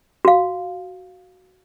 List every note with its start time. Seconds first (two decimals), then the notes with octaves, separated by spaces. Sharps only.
0.25 F#4 F5